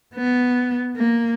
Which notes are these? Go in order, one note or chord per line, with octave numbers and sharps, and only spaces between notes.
B3
A#3